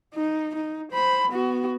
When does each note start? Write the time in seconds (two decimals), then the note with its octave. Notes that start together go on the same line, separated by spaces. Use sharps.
0.14 D#4
0.55 D#4
0.92 C5 B5
1.30 B3 F#4